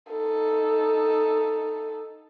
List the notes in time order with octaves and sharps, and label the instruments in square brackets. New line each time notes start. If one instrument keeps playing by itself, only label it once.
[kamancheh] D#4 A4